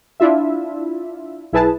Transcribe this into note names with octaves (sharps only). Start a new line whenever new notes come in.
D4 E4 F4 E5
B1 E4 G#4 B4 A5